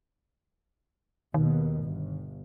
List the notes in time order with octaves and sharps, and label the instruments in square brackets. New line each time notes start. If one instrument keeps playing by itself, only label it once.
[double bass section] D#2 B2 [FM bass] D#3
[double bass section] G1